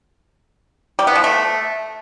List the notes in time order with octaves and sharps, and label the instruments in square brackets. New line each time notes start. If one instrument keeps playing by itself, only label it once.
[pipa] G3
B3
F3
A3